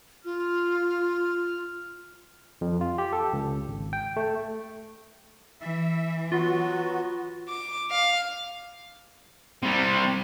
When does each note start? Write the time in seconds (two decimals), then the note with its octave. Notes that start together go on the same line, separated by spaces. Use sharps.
0.25 F4 F6
2.61 F2
2.81 F4
2.98 G4
3.13 A4
3.33 C#2
3.68 G#1
3.93 G5
4.16 A3
5.61 E3 E5
6.32 F#3 B3 F4 F#4
7.48 D6
7.91 F5
9.63 C3 G3